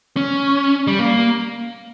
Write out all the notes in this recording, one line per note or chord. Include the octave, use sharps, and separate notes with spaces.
C#4
G3
A#3